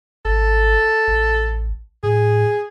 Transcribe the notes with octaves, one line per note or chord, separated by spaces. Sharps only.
G#1 A4
A1
A2 G#4